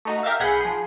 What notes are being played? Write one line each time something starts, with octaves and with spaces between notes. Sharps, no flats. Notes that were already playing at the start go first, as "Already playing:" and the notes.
A3 D#4 F#4
G4 A#4 E5 F5 E6
B1 G#4 F#5 B5 G6 C#7
F3 G#4